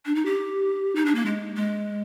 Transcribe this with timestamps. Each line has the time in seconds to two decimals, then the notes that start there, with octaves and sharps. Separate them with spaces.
0.06 D4
0.15 D#4
0.25 G4
0.95 D#4
1.06 D4
1.15 A#3
1.26 G#3
1.56 G#3